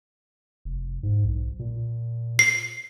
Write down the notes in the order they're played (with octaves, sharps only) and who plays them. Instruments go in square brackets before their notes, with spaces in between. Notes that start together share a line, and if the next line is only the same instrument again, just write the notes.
[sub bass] F1
G#2
B1
A#2
[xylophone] C7